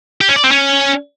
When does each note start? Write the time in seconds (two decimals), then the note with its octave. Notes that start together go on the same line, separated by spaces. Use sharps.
0.21 G4
0.29 C#4
0.36 D5
0.44 C4
0.51 C#4